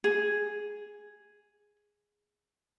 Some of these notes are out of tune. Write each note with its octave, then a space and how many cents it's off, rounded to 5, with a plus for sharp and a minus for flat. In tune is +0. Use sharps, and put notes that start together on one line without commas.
G#4 +0